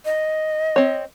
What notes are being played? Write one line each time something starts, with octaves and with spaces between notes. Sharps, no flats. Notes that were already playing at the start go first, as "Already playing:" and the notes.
D#5
C4 C#5